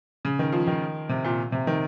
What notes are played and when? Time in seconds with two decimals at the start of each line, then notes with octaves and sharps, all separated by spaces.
0.25 C#3
0.39 D#3
0.52 F3
0.67 D#3
1.09 C3
1.25 A#2
1.52 C3
1.67 D#3